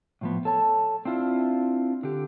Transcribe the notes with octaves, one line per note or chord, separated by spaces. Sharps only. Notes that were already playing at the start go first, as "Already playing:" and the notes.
A2 F3 B3
A4 C#5 A5
C4 D4 E4 F4
D3 G4